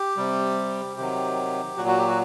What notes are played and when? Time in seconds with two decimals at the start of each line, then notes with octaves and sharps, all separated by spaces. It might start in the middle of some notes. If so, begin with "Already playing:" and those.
Already playing: G4
0.17 C3 G3
0.97 C3 D#3 F#3 G4
1.77 A#2 F#3 F#4
1.88 F#4
1.98 G4
2.08 F#4